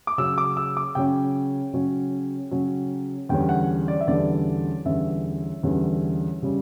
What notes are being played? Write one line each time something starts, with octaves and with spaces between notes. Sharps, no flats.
D6
C#3 F#3 C#4 E6
D6
E6
D6
C#3 F#3 C#4 G5
C#3 F#3 C#4
C#3 F#3 C#4
E2 D3 G3 C#4 G5
F#5
D5
E5
E2 D3 G3 C#4 D5
E2 D3 G3 C#4 E5
E2 D3 G3 C#4
C#3 G3 C#4